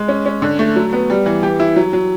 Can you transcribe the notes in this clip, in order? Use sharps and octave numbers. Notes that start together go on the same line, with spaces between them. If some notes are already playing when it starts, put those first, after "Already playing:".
Already playing: G#3
C#4
C#4
D3
A3
F#3
B3
G3
E3
G4
E4
F#3
F#3